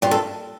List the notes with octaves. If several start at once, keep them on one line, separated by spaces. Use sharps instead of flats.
G2 F4
A4